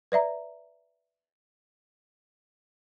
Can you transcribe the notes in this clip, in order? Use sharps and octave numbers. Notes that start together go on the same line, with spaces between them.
B4 D5 E5 A#5